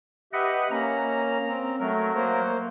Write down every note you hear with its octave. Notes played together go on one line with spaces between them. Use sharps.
G4 B4 D#5 E5 F#5
A#3 C#4 A#5
C4
F#3 A3 A#4
A#3 C5